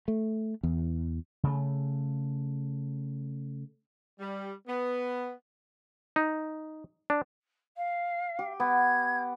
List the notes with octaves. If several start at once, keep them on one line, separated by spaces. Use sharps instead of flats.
A3
E2
C#3 A3
G3
B3
D#4
D4
F5
G4
B3 G#6